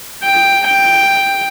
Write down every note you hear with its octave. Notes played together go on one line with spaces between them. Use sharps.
G5
G5